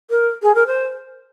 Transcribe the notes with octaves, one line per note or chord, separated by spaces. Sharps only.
A#4
G#4
A#4
C5